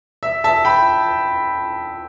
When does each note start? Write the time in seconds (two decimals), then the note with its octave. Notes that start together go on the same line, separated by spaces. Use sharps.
0.23 E5
0.44 E5 A5
0.65 G5 B5